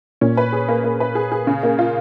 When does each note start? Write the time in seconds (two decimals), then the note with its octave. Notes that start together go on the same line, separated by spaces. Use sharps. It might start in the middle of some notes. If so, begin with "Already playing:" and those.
0.21 A#2 C#4
0.37 B4
0.52 G#4
0.68 A#3
0.84 A#3
1.00 B4
1.15 G#4
1.32 G#4
1.47 C#3
1.63 A#3
1.79 F4